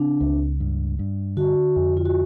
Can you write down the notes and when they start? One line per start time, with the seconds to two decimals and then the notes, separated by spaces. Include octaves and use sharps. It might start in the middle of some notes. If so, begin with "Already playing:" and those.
Already playing: C#3 C4 D4
0.20 C#2
0.60 G2
0.99 G2
1.37 D3 F#4
1.76 F2
1.97 F4
2.05 F#4